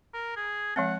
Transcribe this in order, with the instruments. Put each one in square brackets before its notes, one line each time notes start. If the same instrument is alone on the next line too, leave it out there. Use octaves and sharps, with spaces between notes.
[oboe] A#4
G#4
[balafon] F3 G#3 C4 [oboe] F#5